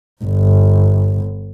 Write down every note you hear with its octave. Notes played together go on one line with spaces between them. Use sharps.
G1